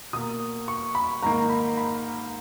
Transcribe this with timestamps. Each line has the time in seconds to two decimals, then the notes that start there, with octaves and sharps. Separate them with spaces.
0.13 B2 A#3 D#6
0.68 C#6
0.95 B5
1.22 G#2 D#3 A#3 A#5
1.50 B5
1.77 B5